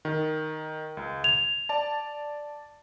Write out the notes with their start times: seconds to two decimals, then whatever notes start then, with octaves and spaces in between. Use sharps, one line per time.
0.05 D#3
0.97 C#2
1.24 G#6 F7
1.69 D5 A5